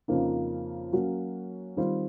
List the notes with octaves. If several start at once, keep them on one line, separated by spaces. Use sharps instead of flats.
F2 C#3 F3 A#3 D#4
F#3 A#3 C#4 F#4
D#3 G3 C4 F4